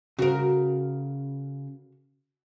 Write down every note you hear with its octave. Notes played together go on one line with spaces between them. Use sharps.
C#3 F#4 A#4